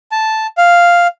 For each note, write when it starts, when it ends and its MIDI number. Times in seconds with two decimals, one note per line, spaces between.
0.12 0.47 81
0.58 1.07 77